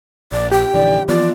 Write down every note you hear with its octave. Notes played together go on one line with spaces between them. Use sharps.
A#1 D5
G4 G5
A#1 D3 E3 D5
E3 F3 B3 F4 D5